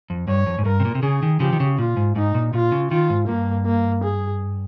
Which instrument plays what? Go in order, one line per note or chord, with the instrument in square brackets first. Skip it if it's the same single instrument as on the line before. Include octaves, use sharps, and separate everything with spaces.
[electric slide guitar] F2
[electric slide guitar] G2 [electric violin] C#5
[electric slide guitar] F2
G#2
[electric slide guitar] G2 [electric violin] A#4
[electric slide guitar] C3
A#2
C3
[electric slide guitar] C#3 [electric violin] G#4
[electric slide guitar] D#3
[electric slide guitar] C#3 F3 [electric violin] G4
[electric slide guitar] D#3
C#3
[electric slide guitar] A#2 [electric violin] F4
[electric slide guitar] G#2
[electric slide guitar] G#2 [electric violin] D#4
[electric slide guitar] A#2
[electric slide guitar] A#2 [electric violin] F4
[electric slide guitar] C#3
[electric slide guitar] D#3 [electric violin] F4
[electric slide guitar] G#2
[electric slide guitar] G2 [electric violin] A#3
[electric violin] A#3
G#4